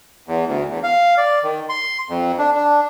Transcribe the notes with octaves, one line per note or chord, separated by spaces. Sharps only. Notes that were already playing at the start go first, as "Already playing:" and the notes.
E2
D2
E2
F5
D5
D#3
C6
F2
D4
D4